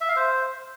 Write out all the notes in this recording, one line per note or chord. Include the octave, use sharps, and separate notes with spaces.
E5
F5
C5